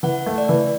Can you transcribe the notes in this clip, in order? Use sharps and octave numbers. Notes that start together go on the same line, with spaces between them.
E3 F#5
A3
D5
E3